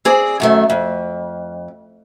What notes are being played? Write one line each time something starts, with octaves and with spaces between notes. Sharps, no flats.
C4 G#4 D5
F#2 D#3 A3
F2